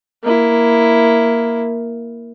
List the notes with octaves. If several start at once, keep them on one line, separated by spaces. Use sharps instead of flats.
A#3 E4